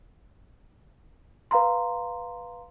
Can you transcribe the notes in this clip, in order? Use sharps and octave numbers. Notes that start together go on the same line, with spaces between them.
B4 F5 A#5 C6